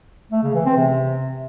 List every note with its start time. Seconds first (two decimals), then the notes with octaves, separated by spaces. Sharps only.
0.32 A3
0.43 C#3
0.54 E3
0.65 C4
0.77 C3